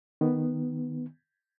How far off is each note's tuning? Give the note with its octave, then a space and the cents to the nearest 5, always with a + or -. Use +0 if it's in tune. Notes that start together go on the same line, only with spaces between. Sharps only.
D#3 +0 B3 +0